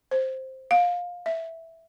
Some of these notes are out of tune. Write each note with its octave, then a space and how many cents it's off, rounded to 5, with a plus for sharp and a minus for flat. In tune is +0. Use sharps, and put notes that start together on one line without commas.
C5 +5
F5 +20
E5 -5